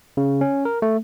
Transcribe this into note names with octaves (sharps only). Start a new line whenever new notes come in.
C#3
C#4
A#4
A3